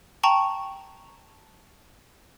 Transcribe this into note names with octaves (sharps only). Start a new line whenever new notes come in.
G5 A5 A#5 C#6 F7 F#7